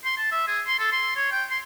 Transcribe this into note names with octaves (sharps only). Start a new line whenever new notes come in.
C6
A5
E5
G#4
C6
A4
C6
C#5
G5
C6